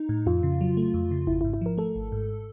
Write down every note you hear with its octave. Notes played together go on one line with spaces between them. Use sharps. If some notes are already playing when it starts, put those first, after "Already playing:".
Already playing: D#4
A2
F2 F4
C#3
F#3
A3
F2
C#3
G#1 E4
G#2 E4
E4
F3 A#4
A3 A4
G#1
G#2